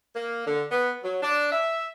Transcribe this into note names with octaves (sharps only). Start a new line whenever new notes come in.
A#3
D3
B3
F#3
D4
E5